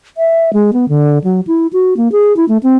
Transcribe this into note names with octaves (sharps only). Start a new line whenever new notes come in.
E5
G#3
B3
D3
F#3
E4
F#4
A#3
G#4
E4
A3
C4